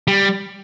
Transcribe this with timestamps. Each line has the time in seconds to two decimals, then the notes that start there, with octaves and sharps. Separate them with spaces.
0.08 G3